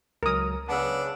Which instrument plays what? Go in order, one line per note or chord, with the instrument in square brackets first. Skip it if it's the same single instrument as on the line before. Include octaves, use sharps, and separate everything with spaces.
[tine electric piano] C#2 F#3 [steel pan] A#4 D#6
[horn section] C#3 B3 [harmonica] D4 [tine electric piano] A5 E6